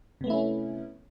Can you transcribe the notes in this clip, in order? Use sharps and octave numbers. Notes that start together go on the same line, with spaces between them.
C3 A3 B3 C#4 E4